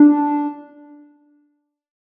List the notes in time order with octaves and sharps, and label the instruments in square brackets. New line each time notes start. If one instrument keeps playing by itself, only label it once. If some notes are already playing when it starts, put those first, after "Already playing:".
Already playing: [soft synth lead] D4